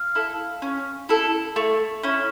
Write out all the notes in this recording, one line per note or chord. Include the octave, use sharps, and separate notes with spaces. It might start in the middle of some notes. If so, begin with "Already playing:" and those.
Already playing: F5
E4 A4
C#4
E4 A4
A3
C#4 E4